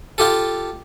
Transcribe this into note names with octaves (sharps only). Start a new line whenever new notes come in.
F4 G4 A4